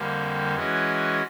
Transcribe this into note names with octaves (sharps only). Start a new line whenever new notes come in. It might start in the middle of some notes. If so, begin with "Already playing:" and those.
Already playing: F2 D3 G3 A#3
E3 G#3 C#4 F#4